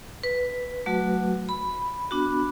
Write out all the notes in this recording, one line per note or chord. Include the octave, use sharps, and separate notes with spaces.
B4
F#3 A3 F#4
B5
B3 D4 F#4